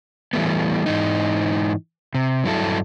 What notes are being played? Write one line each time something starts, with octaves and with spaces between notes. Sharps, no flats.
E3 G3 A3 B3
G#2 E3 D#4
C3
G2 F#3 C#4 E4 A4